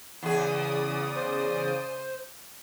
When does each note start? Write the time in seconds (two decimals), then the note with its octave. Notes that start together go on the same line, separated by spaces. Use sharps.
0.23 E2 C#3 G#4 D5 D#6
1.16 C5